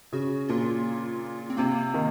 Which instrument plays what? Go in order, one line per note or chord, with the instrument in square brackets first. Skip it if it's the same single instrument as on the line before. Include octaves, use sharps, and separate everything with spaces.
[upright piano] C#3 [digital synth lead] F#4
[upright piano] A#2 [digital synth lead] F4
[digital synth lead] C4
[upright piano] C3 [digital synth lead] A#3
[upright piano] D#3